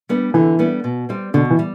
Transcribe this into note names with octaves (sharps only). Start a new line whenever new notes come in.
G3 B3 D4
D3 E3
G3 B3 D4
B2
G3 C4
B2 D3
E3
G3